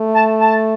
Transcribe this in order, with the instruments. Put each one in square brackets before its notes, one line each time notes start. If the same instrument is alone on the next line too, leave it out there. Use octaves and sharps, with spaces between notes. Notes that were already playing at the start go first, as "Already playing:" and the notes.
Already playing: [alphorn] A3
[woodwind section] A5
A5